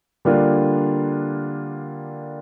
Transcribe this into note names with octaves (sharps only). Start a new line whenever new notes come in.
D3 G3 A#3 D4 F4